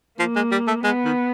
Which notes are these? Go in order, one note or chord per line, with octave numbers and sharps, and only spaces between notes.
F3 A#3
G#3
G3
A3
G#3 B3
D#3